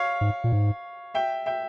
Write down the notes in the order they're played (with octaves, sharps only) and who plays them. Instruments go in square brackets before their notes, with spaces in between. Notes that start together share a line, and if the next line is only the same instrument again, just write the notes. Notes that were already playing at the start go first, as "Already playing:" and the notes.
Already playing: [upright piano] C#5 F5
[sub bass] G#2
A#2
G#2
[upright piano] E5 G5
E5 G5